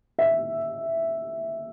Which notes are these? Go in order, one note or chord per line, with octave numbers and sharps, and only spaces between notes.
E5